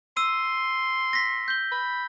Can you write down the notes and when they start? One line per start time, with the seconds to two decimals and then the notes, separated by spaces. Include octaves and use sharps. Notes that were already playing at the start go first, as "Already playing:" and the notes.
0.17 C6 E6 D#7
1.13 A#6 B6
1.48 G6 G7
1.71 B5